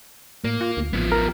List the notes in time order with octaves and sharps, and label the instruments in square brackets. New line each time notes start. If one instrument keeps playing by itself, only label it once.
[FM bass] A2 [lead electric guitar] A#3
[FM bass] F4
D2
[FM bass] A1 [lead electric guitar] F3 B3
[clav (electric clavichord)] A#4